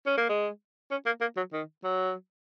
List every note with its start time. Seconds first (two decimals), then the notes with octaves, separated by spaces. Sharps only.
0.06 C#4
0.17 A#3
0.29 G#3
0.91 C#4
1.06 A#3
1.21 A#3
1.37 F#3
1.53 D#3
1.84 F#3